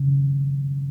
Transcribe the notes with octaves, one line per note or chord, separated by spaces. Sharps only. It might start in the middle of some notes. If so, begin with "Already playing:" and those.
Already playing: C#3